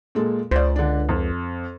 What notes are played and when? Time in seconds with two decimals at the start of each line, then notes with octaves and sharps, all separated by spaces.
0.15 A#2 G#3 A4
0.51 C#2 C5 D5
0.76 D3 D4
1.09 F2